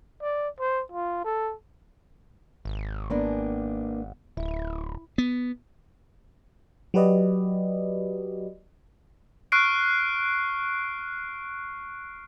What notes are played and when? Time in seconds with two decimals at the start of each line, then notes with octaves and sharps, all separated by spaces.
0.22 D5
0.59 C5
0.92 F4
1.24 A4
2.65 G#1
3.10 A#3 B3 D4
4.37 D1 E4
5.18 B3
6.94 F#3 F#4 G4 B4 D5 D#5
9.52 C#6 F6 F#6 C7 D7